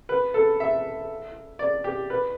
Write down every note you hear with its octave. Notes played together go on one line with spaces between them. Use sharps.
B4
A4
E5
D5
G4
B4